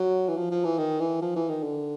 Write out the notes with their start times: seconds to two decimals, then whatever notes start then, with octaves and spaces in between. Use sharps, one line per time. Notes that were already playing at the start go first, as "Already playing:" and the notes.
Already playing: F#3
0.28 E3
0.36 F3
0.51 F3
0.64 E3
0.78 D#3
1.00 E3
1.22 F3
1.35 E3
1.49 D#3
1.63 D3